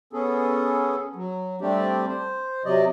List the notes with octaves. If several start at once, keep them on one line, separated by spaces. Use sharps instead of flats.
B3 C#4 G#4 A4
F#3
G3 A3 C4 D4 G4 D5
C5
C3 F#3 D5 D#5